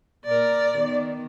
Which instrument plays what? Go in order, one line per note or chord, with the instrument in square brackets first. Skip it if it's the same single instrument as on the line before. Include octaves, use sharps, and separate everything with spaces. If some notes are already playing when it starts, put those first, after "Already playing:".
[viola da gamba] A#2 A#4 [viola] D5
[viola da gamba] D#3 B3